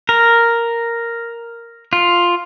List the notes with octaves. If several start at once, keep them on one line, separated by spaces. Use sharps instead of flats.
A#4
F4